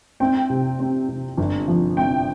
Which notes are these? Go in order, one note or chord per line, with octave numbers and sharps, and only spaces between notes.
C4 G5
C3
C4
C3
G1
F3
C4 G5